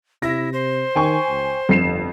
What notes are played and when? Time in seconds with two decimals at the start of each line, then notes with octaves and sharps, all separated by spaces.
0.22 C3 E4 A#6
0.53 C5
0.95 D#3 G5 G#5 C#6
1.29 C#2
1.69 G1 F2 C7 E7